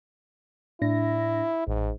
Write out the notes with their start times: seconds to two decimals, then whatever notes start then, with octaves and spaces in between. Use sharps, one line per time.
0.82 A2 D4 E4 A#6
1.67 A1 G#2